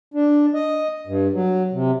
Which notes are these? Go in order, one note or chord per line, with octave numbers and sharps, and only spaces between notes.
D4
D#5
G2
F#3
C3